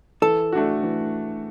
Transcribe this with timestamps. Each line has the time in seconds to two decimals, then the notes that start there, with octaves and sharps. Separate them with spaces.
0.22 E3 A4
0.53 A3 D4 F#4
0.83 E3